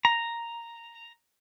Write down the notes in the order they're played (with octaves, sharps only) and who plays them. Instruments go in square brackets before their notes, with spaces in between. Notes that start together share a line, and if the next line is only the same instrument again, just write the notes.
[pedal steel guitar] A#5